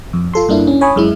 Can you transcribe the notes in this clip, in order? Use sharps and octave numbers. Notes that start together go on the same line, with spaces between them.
F2
F4 A4 C6
G2 A#3 D4 E4
C#4
C#5 G#5 B5 C#6 D#6
F#2 G#3 E4